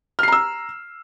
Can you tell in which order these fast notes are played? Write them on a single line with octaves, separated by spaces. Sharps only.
F6 C7 A#5 E6